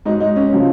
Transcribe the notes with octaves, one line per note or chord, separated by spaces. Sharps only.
G#2 F#3 D#4
D#4
C#4
C#3 F3